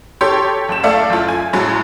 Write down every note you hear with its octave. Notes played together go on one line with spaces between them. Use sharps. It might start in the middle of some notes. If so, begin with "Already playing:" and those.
G4 A4 C#5 G5 C6
F#1 E7
A3 A4 D5 F5
F#1 F4
G#5
A2 F#3 G#3